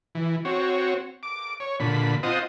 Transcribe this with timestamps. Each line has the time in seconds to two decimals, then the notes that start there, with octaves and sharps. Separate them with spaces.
0.15 E3
0.45 C4 F#4 C#5
1.23 D6
1.60 C#5
1.80 A#2 D3 B5
2.23 C4 F4 C5 D#5 F#5 D#6